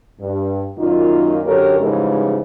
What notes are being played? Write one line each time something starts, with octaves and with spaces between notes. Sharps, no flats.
G2
F#2 A#2 D#3 A#3 D#4 F4
F#2 D3 G4 A4 A#4 C#5
G#2 C#3 E3 F3 G3 G#3